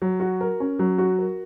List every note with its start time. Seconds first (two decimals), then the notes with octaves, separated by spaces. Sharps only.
0.02 F#3
0.20 F#4
0.41 A#4
0.60 C#4
0.79 F#3
0.98 F#4
1.19 A#4